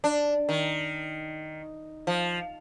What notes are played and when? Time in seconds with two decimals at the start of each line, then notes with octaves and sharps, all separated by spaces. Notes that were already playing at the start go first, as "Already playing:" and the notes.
0.04 D4
0.49 D#3
2.07 F3